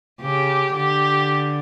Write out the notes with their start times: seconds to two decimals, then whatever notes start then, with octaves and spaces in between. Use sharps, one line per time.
0.22 C#3 G4
0.77 D3 G4